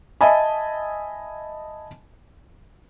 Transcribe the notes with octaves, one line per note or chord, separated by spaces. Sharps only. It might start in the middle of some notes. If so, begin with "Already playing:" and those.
D#5 E5 G#5 A5 B5